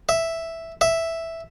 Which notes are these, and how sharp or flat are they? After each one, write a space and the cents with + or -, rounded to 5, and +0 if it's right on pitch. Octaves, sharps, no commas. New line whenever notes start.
E5 +0
E5 +0